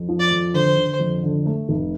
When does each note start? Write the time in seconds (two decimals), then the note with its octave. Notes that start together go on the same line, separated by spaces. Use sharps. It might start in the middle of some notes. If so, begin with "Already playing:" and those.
Already playing: F2
0.09 F3
0.20 D5
0.31 F2
0.54 D3 C5
0.76 D3
0.99 F2
1.23 D3
1.46 A3
1.69 F1